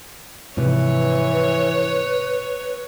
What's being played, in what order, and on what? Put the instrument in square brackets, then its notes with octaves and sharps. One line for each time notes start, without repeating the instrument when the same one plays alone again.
[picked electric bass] G#2 C3 F3 [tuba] E3 [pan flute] B4 [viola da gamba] C#5